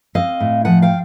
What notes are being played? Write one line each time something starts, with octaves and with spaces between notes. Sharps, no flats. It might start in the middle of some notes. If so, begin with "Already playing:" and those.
C4 D#5 F5
A2
F3 F#5 G#5
F5 G5